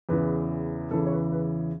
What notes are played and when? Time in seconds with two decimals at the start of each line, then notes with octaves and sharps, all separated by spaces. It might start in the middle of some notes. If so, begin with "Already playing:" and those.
0.09 E2 C#3 E3 B4
0.91 E2 C#3 E3 A4
1.06 C#5
1.12 B4
1.32 B4